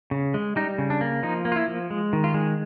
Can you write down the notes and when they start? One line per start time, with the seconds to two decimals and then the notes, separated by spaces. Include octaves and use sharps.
0.11 C#3
0.34 G#3
0.56 G3 D#4
0.78 C#3
0.90 D4
1.01 A#3
1.23 F3 D#4
1.45 A#3
1.52 F4
1.56 E4
1.68 F3
1.90 G#3
2.13 D#3
2.24 F4
2.34 G#3